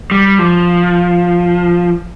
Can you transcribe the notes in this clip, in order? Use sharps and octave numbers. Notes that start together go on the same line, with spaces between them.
G3
F3